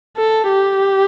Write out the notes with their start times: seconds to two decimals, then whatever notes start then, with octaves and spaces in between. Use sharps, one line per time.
0.17 A4
0.49 G4